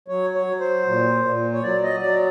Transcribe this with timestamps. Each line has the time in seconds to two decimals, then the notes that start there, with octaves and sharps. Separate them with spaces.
0.08 F#3 C#5
0.35 C#5
0.47 F#3
0.60 C5
0.86 A#2
1.24 A#2
1.53 C#5
1.63 F#3 D5
1.83 D#5
2.01 F#3 D5